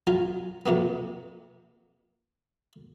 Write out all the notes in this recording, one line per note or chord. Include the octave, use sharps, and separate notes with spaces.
F#3 C#4 F4
F2 C3 A#3 B3